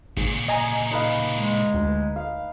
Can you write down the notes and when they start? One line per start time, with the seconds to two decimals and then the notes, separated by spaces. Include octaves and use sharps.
0.17 G#1 A#2 C#3
0.48 D#5 G#5 A#5
0.91 D#4 B4 F5
1.37 G#3
1.74 D2
2.16 F5